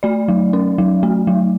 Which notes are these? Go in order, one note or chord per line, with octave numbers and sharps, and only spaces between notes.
A3 D5
F#3
C#4
F#3
A3
F#3